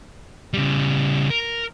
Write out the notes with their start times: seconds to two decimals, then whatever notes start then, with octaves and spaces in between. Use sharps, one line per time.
0.54 C#3 G3
1.30 A#4